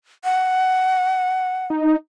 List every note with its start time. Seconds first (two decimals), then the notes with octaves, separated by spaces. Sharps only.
0.24 F#5
1.70 D#4